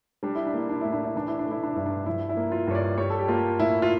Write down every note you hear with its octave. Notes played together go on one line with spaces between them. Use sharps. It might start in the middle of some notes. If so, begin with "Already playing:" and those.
G3 D4
E4
D4
A#3 E4
D4
A2 E4
D4
E4
E3 D4
E4
D4
A3
E4
D4
G2 E4
D4
F3 E4
E4
A#3
F4
G2 C#5
D5
G3 C#5
A4
G4
A#3 F4
A2 E4
F4